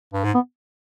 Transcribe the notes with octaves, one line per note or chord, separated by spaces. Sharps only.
G2
G#2
B3